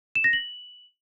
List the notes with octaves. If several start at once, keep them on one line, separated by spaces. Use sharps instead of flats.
E7
A#6
F#7